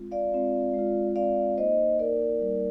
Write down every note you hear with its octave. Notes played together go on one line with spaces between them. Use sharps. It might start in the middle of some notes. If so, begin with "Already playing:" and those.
Already playing: G#3 C4 F4
D5 F5
G#3 C4 F4
G#3 C4 F4
G#3 C4 F4 D5 F5
A#3 D#4 C5 D#5
A#3 D#4 A#4 D5
G3 A#3 D#4